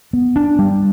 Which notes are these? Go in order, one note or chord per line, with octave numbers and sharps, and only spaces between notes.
B3
D4
G3